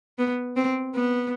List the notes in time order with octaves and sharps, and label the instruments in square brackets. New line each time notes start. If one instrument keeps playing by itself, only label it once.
[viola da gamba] B3
C4
B3